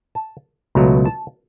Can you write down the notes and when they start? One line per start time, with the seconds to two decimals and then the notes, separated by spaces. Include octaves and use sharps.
0.15 A5
0.75 C#2 B2 F#3 A3 A#5
1.05 A5